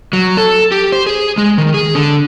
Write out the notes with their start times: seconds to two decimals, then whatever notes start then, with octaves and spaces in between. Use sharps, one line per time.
0.13 F#3
0.37 A4
0.72 G4
0.92 C5
1.06 G#4
1.38 G#3
1.58 D#3
1.74 G#4
1.95 D3